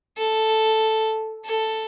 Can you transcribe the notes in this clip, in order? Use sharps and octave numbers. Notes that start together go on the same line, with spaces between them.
A4
A4